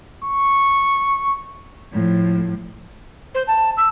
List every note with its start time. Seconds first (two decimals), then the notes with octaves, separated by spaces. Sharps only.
0.24 C#6
1.92 A2 F3
3.35 C5
3.48 A5
3.77 E6